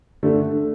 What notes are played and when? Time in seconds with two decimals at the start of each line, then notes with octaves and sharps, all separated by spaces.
0.23 D3 A3 D4 A4